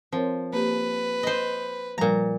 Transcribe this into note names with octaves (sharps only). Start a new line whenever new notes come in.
F3 C4 A#4 C#5
A#3 G4 B4
C5 D#5
A#2 F3 G3 F5 A#5